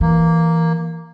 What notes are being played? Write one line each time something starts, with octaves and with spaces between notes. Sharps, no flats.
E3 A#3